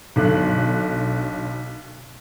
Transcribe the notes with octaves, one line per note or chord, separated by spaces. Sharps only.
B1 D3 F#6